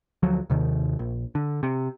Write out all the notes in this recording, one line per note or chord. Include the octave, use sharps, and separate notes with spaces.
D2 F3 F#3
D#2 C3 D#3
A#1
D3
C3